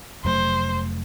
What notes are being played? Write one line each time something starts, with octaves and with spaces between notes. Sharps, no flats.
F1 F#3 A3 C5